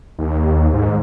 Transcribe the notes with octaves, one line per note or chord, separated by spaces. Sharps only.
D#2
G#2